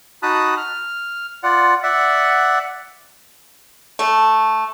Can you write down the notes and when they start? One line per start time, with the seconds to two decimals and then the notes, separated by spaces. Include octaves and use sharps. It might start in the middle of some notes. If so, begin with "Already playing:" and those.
0.23 D#4 F#4 A5 B5 D#6 F#6
0.57 F6
1.43 F4 D5 F#5
1.83 D5 E5 F#5
3.99 A3